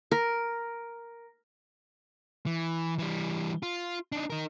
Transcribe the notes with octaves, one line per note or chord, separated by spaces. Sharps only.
A#4
E3
E3 G3
F4
D4 D#4
D#4 A#4